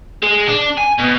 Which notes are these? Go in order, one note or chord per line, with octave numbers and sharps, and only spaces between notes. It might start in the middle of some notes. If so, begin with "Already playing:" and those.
G#3
D4
G#5
B2